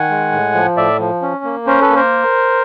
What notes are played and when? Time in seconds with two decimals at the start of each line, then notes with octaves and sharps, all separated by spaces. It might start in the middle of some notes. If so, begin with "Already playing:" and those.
Already playing: D#3 F#5 G#5
0.10 G#3
0.32 A2
0.54 F3
0.77 A2 D5 E5
0.99 F3
1.22 C#4
1.44 A#3
1.67 C#4 A#4 C5
1.81 A4 B4
1.89 A#3
1.96 A#4 C5